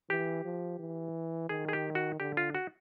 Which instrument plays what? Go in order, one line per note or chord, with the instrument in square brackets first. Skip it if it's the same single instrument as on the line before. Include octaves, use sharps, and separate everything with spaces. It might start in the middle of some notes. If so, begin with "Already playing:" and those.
[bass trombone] E3 [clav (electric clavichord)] G4
[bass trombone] F3
E3
[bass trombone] D#3 [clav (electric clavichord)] G#4
[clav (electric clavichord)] G#4
G4
F#4
[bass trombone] D3 [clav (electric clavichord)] G4
[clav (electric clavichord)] F4
F#4